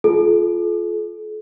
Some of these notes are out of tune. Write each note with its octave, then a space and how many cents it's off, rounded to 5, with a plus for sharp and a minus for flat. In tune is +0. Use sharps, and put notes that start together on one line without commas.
F4 +0 A4 -45